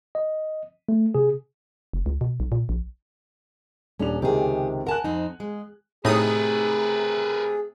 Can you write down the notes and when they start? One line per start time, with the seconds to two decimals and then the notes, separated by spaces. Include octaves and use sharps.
0.15 D#5
0.89 A3
1.15 C3 G#4
1.93 F1
2.06 C#2
2.21 B2
2.40 B1
2.52 A#2
2.69 A#1
3.99 D#1 C#4 D4 F7
4.22 C#2 C3 D#3 G4 G#4
4.87 A#4 F#5 G#5 A5 F#6
5.04 F2 C4 D#4
5.40 G#3
6.05 A2 C3 A3 D#4 G#4 A#4 B4 D#6